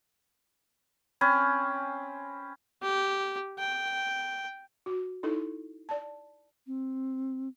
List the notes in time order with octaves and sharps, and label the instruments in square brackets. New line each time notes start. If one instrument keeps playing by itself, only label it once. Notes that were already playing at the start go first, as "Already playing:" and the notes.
[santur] C4 C#4 G#5 B5
[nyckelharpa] G4
G5
[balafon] F#4
D#4 E4 A4
D5 A5
[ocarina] C4